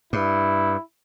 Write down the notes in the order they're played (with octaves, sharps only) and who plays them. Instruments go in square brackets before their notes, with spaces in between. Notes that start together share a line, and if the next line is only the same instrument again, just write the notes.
[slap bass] G2 [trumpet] E4